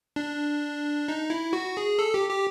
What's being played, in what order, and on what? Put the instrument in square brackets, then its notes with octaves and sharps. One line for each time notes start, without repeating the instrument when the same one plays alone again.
[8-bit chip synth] D4
D#4
E4
F#4
G#4
A4
G4
G4